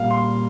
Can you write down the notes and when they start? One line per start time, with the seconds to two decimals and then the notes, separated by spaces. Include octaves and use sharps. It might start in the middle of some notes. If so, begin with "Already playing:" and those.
Already playing: A#2 G3 A#3 F5
0.11 C6